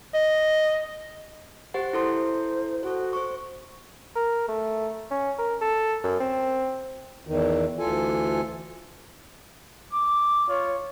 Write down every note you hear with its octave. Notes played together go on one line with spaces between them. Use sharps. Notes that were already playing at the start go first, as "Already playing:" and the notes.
D#5
G4 C5 F#5
E4 A4 C5 C6
F#4 A4 C5
C5 C#6
A#4
A3
C#4
A#4
A4
F#2
C4
E2 D#3
D2 E3 F4 A4 G#5
D6
F4 C#5